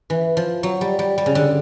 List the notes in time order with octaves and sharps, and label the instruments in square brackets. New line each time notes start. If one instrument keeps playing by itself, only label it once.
[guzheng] E3
F3
F#3
G3
G3
G3
C#3
D3